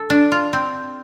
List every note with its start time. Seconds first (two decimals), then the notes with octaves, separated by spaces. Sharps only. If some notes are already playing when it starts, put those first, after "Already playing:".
Already playing: A4
0.10 D4
0.32 F4
0.53 C4